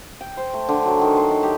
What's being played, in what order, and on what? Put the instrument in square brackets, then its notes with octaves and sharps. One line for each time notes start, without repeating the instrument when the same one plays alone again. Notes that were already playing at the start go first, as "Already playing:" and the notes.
[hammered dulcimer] G5
C5
A3
D3
F#3
D#3
C6
D#4
G4